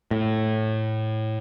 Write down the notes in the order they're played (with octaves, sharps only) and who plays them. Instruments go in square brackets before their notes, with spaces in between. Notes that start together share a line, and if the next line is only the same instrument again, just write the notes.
[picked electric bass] A2